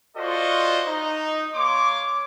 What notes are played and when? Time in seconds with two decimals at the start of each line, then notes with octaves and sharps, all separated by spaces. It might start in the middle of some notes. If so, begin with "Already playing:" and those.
0.17 F4 F#4 A4 C5 D5 D#5
0.86 D#4
1.55 A#3 C#5 C6 D6